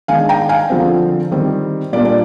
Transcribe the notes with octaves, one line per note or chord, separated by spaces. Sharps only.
D#3 G#3 D4 F5 G#5
G5 A#5
F5 G#5
D3 F3 C4
D#3 G3 C4
A#2 G3 A#3 D4 D5
D5